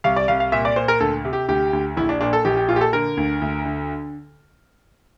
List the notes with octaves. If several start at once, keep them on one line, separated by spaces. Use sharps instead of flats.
C2 F5
D5
C2 F5
F5
A#2 E5
D5
A#2 C5
A#4
D2 A4
C3
G4
D2 G4
D2
A#1 E4
D4
A#2 D4
A4
A#1 G4
G4
A#2 F4
G4
A4
D3 A#4
D2
D2
D3